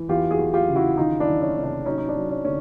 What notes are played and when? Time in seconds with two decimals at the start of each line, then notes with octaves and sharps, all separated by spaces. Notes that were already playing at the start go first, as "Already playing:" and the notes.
Already playing: E3
0.09 E2 F4 G4
0.31 F#4 G#4
0.39 E2
0.53 F4 G4
0.68 C#3
0.76 E4 F#4
0.97 D#3 D#4 F4
1.20 D4 E4
1.27 D#3
1.41 C#4 D#4
1.55 C3 C#4
1.64 D4
1.85 F#3 C#4 D#4
1.98 D#4
2.08 D4
2.15 F#3
2.30 C#4
2.45 D3 C#4